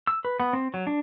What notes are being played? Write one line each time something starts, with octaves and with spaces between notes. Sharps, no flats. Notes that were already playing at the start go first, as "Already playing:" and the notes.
E6
B4
B3
C4
F#3
D4